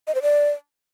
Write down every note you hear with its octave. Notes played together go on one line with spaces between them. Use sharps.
D#5
C5
D5